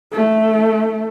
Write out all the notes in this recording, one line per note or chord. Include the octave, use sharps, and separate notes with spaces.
A3